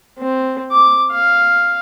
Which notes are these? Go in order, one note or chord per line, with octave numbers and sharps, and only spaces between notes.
C4
D6
F5